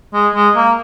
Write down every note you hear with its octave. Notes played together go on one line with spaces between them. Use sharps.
G#3
G#3
A#3